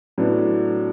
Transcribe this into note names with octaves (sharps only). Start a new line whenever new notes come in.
A2 F#3 B3 D4